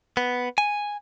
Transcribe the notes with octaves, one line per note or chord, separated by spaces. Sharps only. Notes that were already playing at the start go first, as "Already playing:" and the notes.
B3
G#5